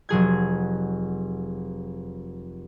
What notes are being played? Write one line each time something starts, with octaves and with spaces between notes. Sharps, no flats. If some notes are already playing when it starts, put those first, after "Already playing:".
F1 F#3 G#4 G#6